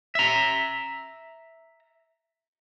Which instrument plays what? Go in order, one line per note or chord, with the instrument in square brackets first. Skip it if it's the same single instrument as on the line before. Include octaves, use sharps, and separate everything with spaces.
[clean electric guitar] E5 A#5